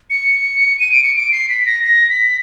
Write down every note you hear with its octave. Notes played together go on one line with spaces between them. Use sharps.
C#7
D#7
D7
C#7
D7
C7
B6
A#6
A#6
B6